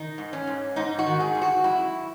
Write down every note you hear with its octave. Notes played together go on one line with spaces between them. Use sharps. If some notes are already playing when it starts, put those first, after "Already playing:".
Already playing: D#3 D#4
G#2
C#4
G#2
G#2 D#4
F#4
D#3
G#4
G#2
F#4
F#2 E4